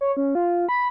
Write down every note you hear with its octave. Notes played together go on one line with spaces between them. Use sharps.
C#5
C#4
F4
B5